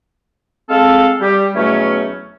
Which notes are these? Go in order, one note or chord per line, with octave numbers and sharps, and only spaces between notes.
G#3 C4 A4 F5
G3 G4
E2 B2 F#3 A3 C#4